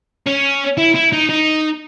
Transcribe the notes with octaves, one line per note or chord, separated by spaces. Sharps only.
C#4
E4
E4
D#4
D#4